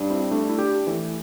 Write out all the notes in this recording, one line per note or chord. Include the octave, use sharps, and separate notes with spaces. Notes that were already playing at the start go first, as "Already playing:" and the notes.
Already playing: G2
C4 E4
A3 D4
E4
D4 G4
E3 A3